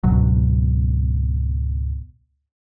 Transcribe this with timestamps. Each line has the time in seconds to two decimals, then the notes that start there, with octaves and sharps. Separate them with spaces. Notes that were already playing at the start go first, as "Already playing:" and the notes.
0.03 C#2 G#2 B2 F#3